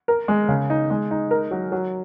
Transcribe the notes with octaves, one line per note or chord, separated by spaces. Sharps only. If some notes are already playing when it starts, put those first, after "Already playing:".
A#4
G#3
C#3
D#4
G#3
D#4
A#4
F#3
F#3